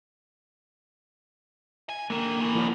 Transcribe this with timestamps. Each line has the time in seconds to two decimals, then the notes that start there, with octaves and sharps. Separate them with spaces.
1.89 G#5
2.10 D3 D#3 A#3
2.40 A2 E3
2.55 F3 A#3 F#4